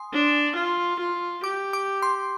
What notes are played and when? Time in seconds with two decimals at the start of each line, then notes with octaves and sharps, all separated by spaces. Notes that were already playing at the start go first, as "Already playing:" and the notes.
Already playing: G#5 C6 D#6
0.13 D4
0.56 F4
1.00 F4
1.44 G4 D6
1.73 D6
2.02 C6